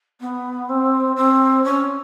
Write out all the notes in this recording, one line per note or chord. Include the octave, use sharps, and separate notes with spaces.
B3
C4
C4
C#4